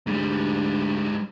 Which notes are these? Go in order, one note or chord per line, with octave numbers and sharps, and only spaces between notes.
D2 G#2 G3